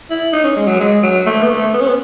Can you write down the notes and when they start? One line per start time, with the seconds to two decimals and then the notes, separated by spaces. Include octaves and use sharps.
0.10 E4
0.33 D#4
0.44 C#4
0.56 G#3
0.67 F#3
0.80 G#3
1.03 F#3
1.26 A3
1.43 B3
1.50 A3
1.73 B3
1.81 C#4
1.88 B3